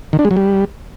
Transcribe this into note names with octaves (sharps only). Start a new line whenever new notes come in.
D#3
D4
G#3
F#3
G3